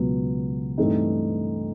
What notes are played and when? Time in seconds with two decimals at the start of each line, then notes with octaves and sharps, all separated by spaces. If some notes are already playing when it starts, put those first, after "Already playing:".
Already playing: C#2 B2 F#3 B3
0.78 G2 E3 A3 C4 D#4